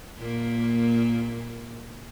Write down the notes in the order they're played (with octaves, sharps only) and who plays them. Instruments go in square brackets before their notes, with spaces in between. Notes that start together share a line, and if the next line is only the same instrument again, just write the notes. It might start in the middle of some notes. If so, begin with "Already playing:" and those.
[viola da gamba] A#2 A#3